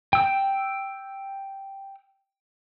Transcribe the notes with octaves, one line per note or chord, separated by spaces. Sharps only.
G5 E6